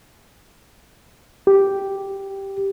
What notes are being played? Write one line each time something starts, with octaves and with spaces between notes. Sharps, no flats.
G4